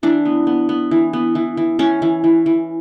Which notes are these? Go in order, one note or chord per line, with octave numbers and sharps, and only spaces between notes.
E3 D4
B3
B3
B3
E3
B3
E3
E3
E3 C#4
E3
E3
E3